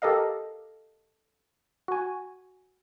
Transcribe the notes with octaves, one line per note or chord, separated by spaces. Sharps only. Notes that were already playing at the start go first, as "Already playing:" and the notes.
G4 A4 A#4 D#5 F5
F#4 G#5